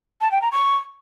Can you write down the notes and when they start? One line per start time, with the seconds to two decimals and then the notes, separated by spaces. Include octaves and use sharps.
0.21 A5
0.31 G5
0.42 A#5
0.52 C#6